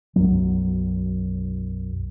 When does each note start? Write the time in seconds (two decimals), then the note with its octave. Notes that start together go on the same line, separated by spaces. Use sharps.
0.16 B1 F#2 F#3